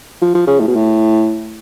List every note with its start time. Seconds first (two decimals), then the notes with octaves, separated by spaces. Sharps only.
0.21 F3
0.34 F3
0.47 C#3
0.60 A2
0.67 B2
0.75 A2